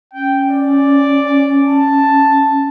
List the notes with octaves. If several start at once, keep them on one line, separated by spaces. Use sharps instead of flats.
C#4 G5
D5
A5